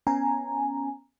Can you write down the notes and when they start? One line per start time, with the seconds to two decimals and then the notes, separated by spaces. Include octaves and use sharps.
0.07 B3 C#4 G#5 A#5